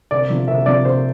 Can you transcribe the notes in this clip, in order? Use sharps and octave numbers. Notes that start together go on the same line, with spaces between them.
C2 D5
C3 F3
C2 E5
C3 F3 D5
C2 C5